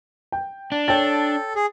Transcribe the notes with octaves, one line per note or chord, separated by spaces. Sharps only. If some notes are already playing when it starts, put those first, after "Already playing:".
G5
D4
A4 C#5 G5 A6
G#4